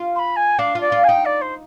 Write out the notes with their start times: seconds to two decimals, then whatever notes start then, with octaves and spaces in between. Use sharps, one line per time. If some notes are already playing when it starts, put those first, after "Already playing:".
Already playing: F4
0.15 C6
0.19 B5
0.36 G#5
0.59 D4 F5
0.75 F4
0.81 D5
0.92 F4
1.04 G#5
1.08 D#4 G5
1.25 D5
1.41 C5